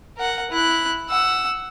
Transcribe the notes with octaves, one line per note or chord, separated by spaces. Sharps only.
A#4 F#5
E4 F#6
F#5 E6